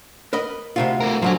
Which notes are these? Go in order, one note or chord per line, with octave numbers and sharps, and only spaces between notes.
A#4 B4 D#5
D2 C3 F4
A3 A#4
G#2 D3 F3 F#3 G#5